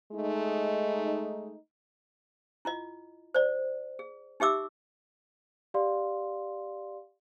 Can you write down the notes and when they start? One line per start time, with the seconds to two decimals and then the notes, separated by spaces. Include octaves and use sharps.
0.12 G#3 A3 D#4
2.65 E4 F4 D#5
3.34 C5 D5
3.99 G#4
4.40 D#4 G4 E5 D6 E6
5.74 G4 D5 F5 C6